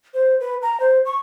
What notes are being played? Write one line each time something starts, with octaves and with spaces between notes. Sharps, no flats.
C5
B4
A#5
C5
C#6